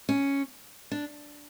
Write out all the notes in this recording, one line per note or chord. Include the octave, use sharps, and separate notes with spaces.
C#4
D4